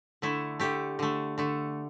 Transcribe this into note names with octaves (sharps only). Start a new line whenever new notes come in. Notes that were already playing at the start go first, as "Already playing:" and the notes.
D3 A3 E4
D3 A3 G4
D3 A3
D3 A3